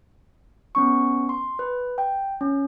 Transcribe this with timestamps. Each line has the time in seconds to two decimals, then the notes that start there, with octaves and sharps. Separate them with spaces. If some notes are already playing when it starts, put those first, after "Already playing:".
0.75 B3 C#4 C#6
1.29 C6
1.59 B4
1.98 G5
2.41 C#4